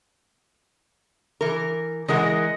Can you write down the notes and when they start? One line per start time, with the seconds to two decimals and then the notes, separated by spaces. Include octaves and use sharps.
1.41 E3 A#4
2.08 E3 G#3 A#4 D#5 F#5 C6